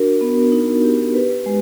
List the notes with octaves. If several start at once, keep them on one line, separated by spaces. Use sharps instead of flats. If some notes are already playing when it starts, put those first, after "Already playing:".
Already playing: D4 F#4 A#4
B3
D#4
G4
B4
G#3